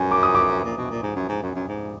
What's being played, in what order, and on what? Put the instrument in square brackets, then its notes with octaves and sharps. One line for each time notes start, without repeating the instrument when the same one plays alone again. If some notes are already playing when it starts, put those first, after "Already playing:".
Already playing: [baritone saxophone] F#2 [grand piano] G#5
[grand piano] D6
D#6
D6
[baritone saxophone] A#2
B2
A#2
G#2
F#2
G#2
F#2
F#2
G#2